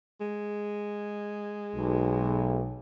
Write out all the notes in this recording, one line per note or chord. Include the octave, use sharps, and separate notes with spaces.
G#3
B1